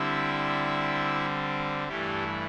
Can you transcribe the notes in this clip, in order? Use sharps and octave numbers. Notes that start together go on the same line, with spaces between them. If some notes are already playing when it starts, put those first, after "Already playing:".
Already playing: D3 G3 C4 E4 E5
G2 E3 G3 A3 E4 G4